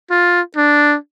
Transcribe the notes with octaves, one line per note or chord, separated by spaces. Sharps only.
F4
D4